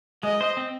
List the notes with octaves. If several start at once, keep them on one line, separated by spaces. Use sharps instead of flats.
G#3 D#5
C5
C4